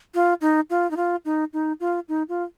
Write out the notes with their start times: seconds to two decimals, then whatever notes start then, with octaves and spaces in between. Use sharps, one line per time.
0.14 F4
0.41 D#4
0.70 F4
0.91 D#4
0.97 F4
1.25 D#4
1.53 D#4
1.80 F4
2.08 D#4
2.29 F4